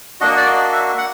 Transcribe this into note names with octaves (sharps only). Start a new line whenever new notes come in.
A#3 D4 F#4 D#5
D5
D#5
E5
F#5